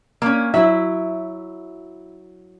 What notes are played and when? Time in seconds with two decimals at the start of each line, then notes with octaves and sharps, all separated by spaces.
0.22 A#3 C#4
0.54 F#3 E4 E5